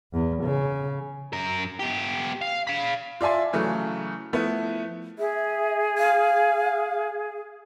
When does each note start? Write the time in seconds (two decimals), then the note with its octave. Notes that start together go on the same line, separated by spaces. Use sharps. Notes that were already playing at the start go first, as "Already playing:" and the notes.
0.13 E2
0.44 C#3
1.33 F#2 A#4
1.79 B3 G4
2.41 F5
2.67 F5 B5
3.21 F4 D5 E5 G#5 C6
3.53 C#3 E3 F#3 A3
4.33 F3 A3 B3 E4
5.19 G#4 E5
5.98 F5